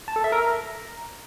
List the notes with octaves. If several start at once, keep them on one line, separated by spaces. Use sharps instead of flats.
A5
A4
E5
A#4
A#5